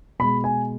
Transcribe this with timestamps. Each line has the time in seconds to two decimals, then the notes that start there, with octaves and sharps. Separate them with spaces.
0.19 B2 G#3 B5
0.44 G#5